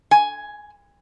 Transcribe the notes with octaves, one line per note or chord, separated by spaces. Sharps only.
G#5